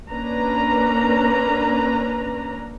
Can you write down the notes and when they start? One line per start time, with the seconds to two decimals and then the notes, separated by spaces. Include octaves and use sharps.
0.10 A#3 C#4 D4 B4 A#5